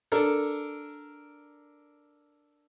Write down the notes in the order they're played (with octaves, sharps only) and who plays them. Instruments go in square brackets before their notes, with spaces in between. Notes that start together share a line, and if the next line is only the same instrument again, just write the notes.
[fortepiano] D4 A4 A#4